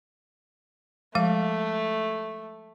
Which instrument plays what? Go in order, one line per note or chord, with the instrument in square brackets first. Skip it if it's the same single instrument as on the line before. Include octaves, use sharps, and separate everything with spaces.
[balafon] F3 G#3 F5 [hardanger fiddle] A3